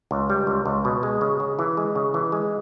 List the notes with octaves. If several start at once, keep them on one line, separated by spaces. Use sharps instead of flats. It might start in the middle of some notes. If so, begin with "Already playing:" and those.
C#2
G3
C#2
C#2
B2
G#3
C#3
C#3
E3
G#3
C#3
E3
G#3